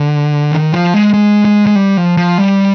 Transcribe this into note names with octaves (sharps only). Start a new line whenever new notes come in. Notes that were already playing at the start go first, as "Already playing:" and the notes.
Already playing: D3
D#3
F3
G#3
G#3
G#3
G#3
G3
F3
F3
G3